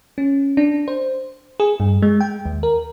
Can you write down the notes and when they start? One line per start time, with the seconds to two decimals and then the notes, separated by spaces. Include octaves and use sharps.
0.18 C#4
0.57 D4
0.88 C5
1.60 G#4
1.80 G2
2.02 G#3
2.21 G5
2.45 D#2
2.63 A#4